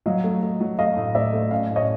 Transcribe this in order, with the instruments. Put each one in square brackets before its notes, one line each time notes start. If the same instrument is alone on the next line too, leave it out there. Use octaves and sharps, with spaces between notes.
[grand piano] F#3 [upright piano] D#5 F5
[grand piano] A3
A3
F#3
[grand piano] A3 [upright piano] D#5 F5
[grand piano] A2
[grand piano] A2 [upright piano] D5 E5
[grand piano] A3
[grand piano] C#4 [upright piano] D#5 F5
[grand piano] A2
[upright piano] C#5 D#5